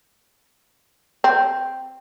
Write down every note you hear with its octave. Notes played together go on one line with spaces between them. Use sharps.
C4